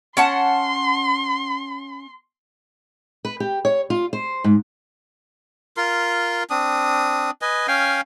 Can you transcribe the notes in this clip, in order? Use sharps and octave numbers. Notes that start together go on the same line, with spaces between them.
C#4 F#5 A5 C6
B4
G4
C#5
F4
C5
G#2
F4 A#4 C6
C4 D4 D#6
B4 D#5 G#5
C#4 F5 G5 G#5